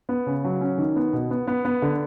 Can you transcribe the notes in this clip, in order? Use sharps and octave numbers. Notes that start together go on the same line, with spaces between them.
B3
C#3
F#3
C#4
D#3
B3
B2
B3
B3
B3
D3